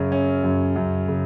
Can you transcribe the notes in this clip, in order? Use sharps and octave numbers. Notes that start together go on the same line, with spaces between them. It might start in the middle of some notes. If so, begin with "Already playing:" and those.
Already playing: F#2 C#3 C#4
C#4
F#2
F#2
C#3